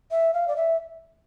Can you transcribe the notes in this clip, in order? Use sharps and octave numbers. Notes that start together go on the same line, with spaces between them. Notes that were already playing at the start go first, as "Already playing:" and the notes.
E5
F5
D5
E5